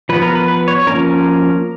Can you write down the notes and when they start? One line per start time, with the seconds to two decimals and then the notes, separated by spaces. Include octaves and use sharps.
0.09 F3 B3 B4
0.22 A#4
0.35 B4
0.48 B4
0.68 C#5
0.87 F3 A#3 C#4 A#4